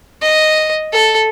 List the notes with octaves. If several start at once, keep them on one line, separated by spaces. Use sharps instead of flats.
D#5
A4